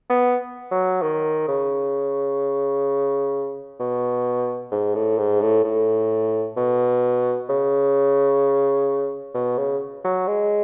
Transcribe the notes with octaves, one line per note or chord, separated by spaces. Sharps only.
B3
F#3
D#3
C#3
B2
G#2
A2
G#2
A2
A2
B2
C#3
B2
C#3
F#3
G#3